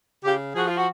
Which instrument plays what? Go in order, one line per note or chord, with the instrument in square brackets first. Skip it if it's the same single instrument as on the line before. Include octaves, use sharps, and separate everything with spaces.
[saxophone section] C#3 F4 G4
F3 F#4 G#4
F4
F#4